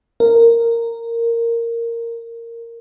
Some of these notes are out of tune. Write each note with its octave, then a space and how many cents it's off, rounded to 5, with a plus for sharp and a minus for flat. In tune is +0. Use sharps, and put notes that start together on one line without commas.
A#4 -10